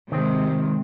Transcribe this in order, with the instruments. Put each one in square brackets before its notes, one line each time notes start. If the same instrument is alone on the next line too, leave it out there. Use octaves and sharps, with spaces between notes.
[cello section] C3 G#3 [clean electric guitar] D#3 C4